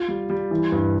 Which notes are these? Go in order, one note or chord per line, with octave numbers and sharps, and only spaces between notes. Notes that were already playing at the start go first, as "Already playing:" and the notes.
Already playing: F4
G3
G3
E3
G2